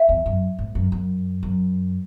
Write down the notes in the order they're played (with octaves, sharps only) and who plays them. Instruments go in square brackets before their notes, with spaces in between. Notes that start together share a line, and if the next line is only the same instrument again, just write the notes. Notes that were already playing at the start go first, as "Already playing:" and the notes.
Already playing: [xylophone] E5
[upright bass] E2
F#2
G#2
F#2
F#2
F#2